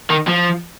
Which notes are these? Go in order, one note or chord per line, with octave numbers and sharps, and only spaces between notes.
D#3
F3